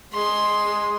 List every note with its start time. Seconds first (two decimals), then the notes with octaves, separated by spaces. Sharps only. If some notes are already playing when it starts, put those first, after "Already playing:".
0.13 G#3 C6